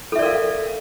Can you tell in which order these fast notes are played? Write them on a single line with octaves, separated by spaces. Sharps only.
A4 E5 D5 A#4 F5